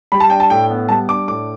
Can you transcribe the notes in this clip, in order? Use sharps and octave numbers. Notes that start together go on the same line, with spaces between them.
G3 B5
A5
D4 G5
A5
A2 G5
B3
G3 A5
D4 D6
A2 D6